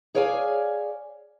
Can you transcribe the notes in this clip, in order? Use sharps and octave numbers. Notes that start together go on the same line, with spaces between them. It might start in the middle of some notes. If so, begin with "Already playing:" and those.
G#4 C#5 D5 F5 F#5 G#5